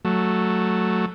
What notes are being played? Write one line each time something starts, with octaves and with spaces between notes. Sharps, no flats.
F#3 A3